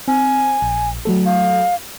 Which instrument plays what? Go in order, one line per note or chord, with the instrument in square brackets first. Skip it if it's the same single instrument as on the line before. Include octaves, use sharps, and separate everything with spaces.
[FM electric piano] C4 [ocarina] G#5
[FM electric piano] A#1
F#3 A3 A4
[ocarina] F5